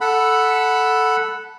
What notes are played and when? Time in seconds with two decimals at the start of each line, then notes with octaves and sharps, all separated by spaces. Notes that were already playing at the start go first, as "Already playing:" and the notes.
0.01 A4 F#5 B5